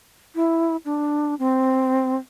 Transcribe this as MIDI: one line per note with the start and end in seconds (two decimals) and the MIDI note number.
0.35 0.76 64
0.85 1.35 62
1.39 2.16 60